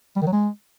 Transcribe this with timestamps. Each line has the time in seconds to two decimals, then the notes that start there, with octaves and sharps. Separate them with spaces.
0.16 G3
0.22 D#3
0.27 F#3
0.32 G#3